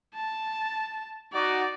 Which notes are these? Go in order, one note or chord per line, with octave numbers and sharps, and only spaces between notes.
A5
D#4 F#4 D5